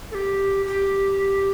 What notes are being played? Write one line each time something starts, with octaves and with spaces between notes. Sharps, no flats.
A4
G4
G4